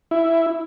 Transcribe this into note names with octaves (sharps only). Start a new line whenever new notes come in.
E4